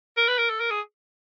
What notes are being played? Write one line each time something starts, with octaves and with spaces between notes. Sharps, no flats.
A#4
B4
A#4
A4
A#4
G#4